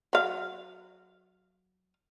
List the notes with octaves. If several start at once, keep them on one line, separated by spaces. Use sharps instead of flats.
F#3 F5